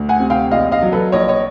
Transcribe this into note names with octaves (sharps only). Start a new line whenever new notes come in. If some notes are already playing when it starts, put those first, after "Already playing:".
Already playing: D2
F#5 G#5
C3
F5 G5
A#1 D#5 F5
D#5 F5
F#3
A4 B4
A#1 C#5 D#5
C#5 D#5